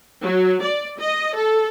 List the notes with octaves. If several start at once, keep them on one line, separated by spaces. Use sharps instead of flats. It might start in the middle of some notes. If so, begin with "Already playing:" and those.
F#3
D5
D#5
A4